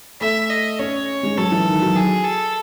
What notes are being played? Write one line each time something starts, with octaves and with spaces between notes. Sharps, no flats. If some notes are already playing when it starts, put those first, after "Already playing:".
A3 E5
D#5
C#4 C#5
G#3
F#3 A4
E3
D#3
F#3
G#4
A4